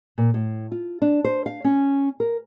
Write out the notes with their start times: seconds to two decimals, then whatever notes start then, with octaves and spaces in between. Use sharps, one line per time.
0.18 A#2
0.34 A2
0.72 F4
1.02 D4
1.24 C5
1.46 F5
1.64 C#4
2.20 A#4